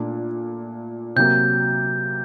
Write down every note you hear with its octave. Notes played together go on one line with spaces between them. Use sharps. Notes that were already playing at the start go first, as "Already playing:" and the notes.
Already playing: A#2 A3 D4
C3 F#3 A#3 G6